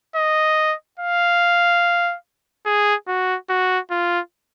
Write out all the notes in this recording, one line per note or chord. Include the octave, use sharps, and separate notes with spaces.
D#5
F5
G#4
F#4
F#4
F4